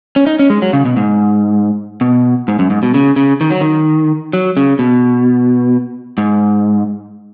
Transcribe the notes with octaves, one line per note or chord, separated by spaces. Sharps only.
C#4
D#4
C#4
G#3
F#3
C#3
B2
G#2
B2
G#2
F#2
G#2
B2
C#3
C#3
D#3
F#3
D#3
F#3
C#3
B2
G#2